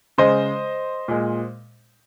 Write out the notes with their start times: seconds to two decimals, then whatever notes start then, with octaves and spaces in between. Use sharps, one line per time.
0.18 C#3 G#3 C5 D#5
1.08 A#2 G#3